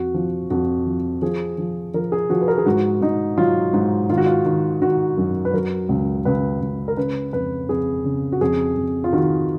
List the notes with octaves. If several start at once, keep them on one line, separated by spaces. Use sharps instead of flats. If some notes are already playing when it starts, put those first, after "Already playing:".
Already playing: F2 F#4
F3
F2 F#4
F3
F3 G#4
F3
F3 A#4
G#4
F3 F#4
B4
A#4
G#4
G#2 F#4
G#2 D#4
F#3 F4
G#2
D#3 F4
F#4
F4
D#3
D#3 F#4
F#2
B4
F#3 A#4
C#2
C#2 B4
C#2
A#4
C#3 B4
F2 B4
F2 G#4
C#3
F#4
F2 G#4
F2
F4
D#3 F#4